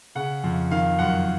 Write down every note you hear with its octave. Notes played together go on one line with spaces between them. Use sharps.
C#3 F#5
F2
D#3 F5
F#2 F#5